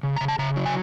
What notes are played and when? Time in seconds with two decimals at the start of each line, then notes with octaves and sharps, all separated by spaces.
0.03 C#3
0.16 C#3 A#5
0.28 A5
0.39 C#3 A#5
0.56 F#3
0.66 G#5